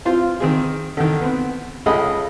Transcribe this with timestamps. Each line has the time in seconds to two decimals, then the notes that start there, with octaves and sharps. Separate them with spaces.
0.05 C4 F4 C5 F5
0.40 D#3 C4 G#4
0.97 D3 D#3
1.21 B3 C4
1.86 C#2 C#3 A3 D#5 B5 D#6